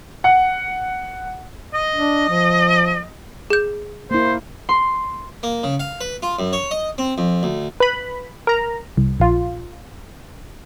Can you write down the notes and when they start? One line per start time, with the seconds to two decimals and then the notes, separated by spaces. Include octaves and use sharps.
0.24 F#5
1.74 D#5
1.96 D4
2.30 F3
3.50 G#4 G6
4.11 A#3 E4 C5
4.69 C6
5.43 A#3
5.63 C#3
5.80 F5
6.01 B4
6.22 F4
6.39 F#2
6.53 C#5
6.71 D#5
6.98 C4
7.18 F2
7.43 D2
7.80 B4 B5
8.47 A#4 A#5
8.97 C2
9.20 A#1 F4